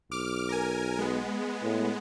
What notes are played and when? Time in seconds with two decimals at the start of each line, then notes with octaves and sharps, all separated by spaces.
0.11 B1 D6 F6
0.49 A#4 G#5
0.99 G#3 B3
1.63 A2